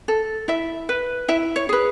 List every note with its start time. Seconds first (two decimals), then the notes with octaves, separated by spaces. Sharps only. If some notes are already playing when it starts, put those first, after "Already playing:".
0.08 A4
0.48 E4 E5
0.89 B4
1.28 E4 E5
1.56 C#5
1.69 G#4 B4